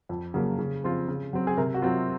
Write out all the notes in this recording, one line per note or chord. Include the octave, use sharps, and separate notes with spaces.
F2
C#3 F#3 A#3
C#3
F3 C4 F4
C#3
F#3 C4
G#4
C3 A#4
F#4
F#3 C4 F4